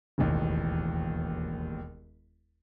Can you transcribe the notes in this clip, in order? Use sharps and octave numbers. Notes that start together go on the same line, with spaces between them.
E1 A1 D#2